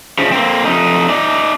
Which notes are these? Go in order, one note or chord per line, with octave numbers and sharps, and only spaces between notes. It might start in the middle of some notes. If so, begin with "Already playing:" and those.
C#3 F3
A#3 C4
F2 D#4
D#4 D5